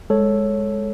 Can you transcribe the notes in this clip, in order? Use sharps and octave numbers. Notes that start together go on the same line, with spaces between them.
G#3 A4 C#5